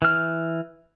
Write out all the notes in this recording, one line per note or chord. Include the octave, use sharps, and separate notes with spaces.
E3 F6